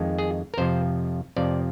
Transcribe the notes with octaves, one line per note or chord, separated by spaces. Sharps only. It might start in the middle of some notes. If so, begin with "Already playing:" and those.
Already playing: F2 D#3 G#3
G#4
A#4
F2 C3 F3 C5
F2 C3 F3 D5